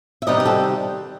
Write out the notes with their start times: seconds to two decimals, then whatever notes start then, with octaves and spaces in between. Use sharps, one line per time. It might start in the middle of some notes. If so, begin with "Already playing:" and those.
0.22 E5
0.27 C3 D#3 G3 C4 D#4 B4 D#5
0.40 B4
0.45 F#4 A4